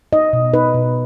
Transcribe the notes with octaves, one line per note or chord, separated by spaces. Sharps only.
D#4 D#5
B2
D#4 B4
B2